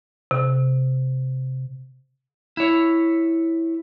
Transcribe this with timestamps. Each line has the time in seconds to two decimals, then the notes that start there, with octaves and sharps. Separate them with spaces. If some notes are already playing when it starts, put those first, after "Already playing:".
0.31 C3
2.57 E4 C#5